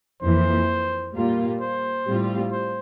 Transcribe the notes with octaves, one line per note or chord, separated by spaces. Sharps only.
F2 E3 A#3 C5
A#2 G3 A#3 F4
C5
A2 G3 C4 F4
C5